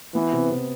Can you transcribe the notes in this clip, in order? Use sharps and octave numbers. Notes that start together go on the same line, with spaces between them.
E3 B3
C3
C3